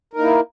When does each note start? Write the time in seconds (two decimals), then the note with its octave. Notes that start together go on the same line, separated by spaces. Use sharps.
0.13 A#4
0.16 D#4
0.19 A#3
0.21 E4